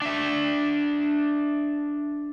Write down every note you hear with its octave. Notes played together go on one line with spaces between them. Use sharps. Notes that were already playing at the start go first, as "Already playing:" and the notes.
D4 E5